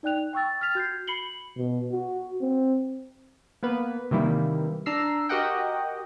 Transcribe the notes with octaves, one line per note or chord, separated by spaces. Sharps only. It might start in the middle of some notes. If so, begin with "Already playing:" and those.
D#4 D5 G5 F#6 F7
G5 C#6 E6 A6
F6 A6 B6 F7
F#4 G6 G#6 C7
B5 C7 C#7 F#7 G7
B2
F#4
C4
A#3 B3 B4
C3 D#3 E3 G3 A#3 E4
D4 A#5 E6 C7
F#4 G4 A#4 D#5 F#5 G5